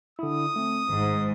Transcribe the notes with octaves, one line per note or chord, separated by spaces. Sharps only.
D3 E4 D#6
A3 C4
G#1 G#2